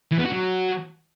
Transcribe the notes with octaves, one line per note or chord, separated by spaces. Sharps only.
E3
B3
F#4
F#3